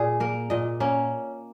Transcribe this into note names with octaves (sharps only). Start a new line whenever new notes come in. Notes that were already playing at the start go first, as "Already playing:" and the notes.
Already playing: A#2 G#4
A#3 A#4
A#2 D#5
A#3 C#4